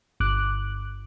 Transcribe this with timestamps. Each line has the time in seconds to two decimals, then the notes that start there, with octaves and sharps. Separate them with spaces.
0.20 G1 D6 F#6